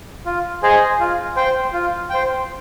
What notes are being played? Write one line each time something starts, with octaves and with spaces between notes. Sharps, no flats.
F4
G#4 C5 D#5 G#5
F4
C5 G5
F4
C5 G5